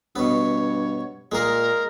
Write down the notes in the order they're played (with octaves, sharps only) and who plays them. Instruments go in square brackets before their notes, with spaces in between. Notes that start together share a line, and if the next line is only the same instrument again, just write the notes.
[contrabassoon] G2 [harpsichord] B2 B3 [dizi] C#5
[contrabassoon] A#2 [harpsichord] G#3 G#4 [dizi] A#4